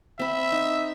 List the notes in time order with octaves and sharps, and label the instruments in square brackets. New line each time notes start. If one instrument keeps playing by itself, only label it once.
[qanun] C4 B5 [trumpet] E5
[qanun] D#4